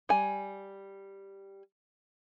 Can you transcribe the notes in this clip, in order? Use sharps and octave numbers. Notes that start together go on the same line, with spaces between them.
G3 G#5